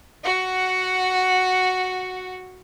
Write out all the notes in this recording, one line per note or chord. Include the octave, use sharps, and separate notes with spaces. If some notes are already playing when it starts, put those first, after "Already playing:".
F#4 F#5